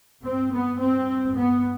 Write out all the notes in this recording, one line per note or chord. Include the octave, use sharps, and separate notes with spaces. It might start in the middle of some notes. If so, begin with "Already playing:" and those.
G2 C4
B3
C4
B3